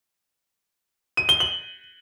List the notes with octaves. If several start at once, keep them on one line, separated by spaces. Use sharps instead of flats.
D#7
G7
F#7